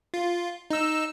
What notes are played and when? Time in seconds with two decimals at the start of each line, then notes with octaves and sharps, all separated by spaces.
0.14 F4
0.71 D#4 E6